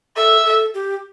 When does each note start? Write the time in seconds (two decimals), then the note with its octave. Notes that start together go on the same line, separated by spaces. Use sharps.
0.17 A4 E5
0.45 A4
0.74 G4